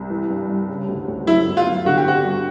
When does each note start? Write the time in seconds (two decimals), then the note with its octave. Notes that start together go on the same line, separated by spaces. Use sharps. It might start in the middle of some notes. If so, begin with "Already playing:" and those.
Already playing: C2
0.10 E3
0.30 G2
0.49 G2
0.68 C#3
0.88 D2
1.08 D2
1.27 F#2 E4
1.47 G1
1.57 F4
1.66 G1
1.85 D3 F#4
1.97 G4
2.05 C4 F#4
2.24 G2